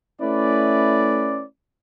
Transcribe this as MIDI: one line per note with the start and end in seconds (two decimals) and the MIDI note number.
0.21 1.44 57
0.21 1.44 61
0.21 1.44 64
0.21 1.44 71
0.21 1.44 74